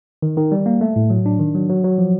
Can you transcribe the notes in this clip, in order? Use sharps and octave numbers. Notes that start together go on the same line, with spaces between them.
D#3
D#3
G3
A#3
A3
A2
F#3
D4
D#3
F#3
F#3
F#3
F3